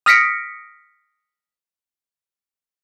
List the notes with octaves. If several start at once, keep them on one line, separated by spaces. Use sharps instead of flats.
D#6 F6 A#6 B6 C#7 D7